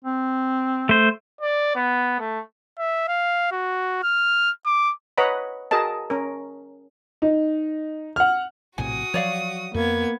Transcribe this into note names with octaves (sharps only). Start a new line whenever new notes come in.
C4
A3 C5
D5
B3
A3
E5
F5
F#4
F6
D6
B4 C#5 D#5 F#5 A#5 B5
F#4 G#4 A#4 D#5 A5
C#4 A#4
D#4
F#5 F6
A#1 A2 C3 F#4 G#5 D#6
F3 F#3 C#5 D5 F5
F2 A#3 B3 G#6